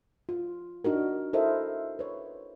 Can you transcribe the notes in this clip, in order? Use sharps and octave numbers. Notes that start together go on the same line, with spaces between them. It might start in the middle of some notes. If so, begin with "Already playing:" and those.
F4
D4 D#4 F#4 A#4
E4 A4 A#4 C5 D#5 E5
B4 C#5